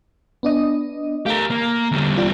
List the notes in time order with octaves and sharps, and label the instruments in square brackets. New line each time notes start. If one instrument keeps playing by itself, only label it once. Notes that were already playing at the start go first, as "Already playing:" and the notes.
[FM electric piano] B3 D4 D#5
[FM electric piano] A3 F5 [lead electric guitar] G4 A#4
[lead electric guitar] A#3
[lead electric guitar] E2 G3 [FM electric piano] D3
[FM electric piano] F4 D5 G5